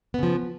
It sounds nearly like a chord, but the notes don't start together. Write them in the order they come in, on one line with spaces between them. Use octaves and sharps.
B3 C#3 F3